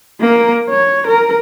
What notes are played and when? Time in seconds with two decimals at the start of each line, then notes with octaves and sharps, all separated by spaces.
0.20 A#3 A#4
0.70 C#5
1.07 A#4